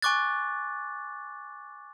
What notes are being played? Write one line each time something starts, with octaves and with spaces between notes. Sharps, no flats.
G#5 C#6 D6 F#6 A6